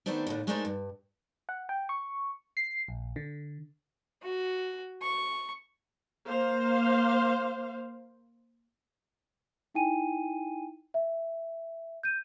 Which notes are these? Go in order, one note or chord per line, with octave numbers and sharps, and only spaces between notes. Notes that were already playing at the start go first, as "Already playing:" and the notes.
D2 D#3 A3 B3 C4 D4
D#2 A2 D3
G#3 A3 D4 D#4 A#4 C5
G2
F#5
G5
C#6
C7
A#1
D3
F#4
C#6
A#3 C5 F5
D#4 E4 G5 G#5 D#7
E5
G6 D#7